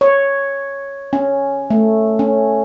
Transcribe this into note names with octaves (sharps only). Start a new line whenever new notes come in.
C#5
C#4
A3
C#4